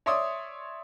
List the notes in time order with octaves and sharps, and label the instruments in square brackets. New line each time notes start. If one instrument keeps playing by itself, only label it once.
[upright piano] C#5 D5 E5 C6 D6 D#6